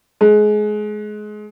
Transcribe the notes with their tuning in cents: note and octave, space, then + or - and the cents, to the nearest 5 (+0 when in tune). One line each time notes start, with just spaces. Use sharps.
G#3 +25